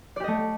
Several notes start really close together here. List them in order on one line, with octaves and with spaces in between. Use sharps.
D5 G4 D#5 A3